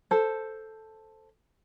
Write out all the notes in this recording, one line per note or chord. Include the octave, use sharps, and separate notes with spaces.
A4 C5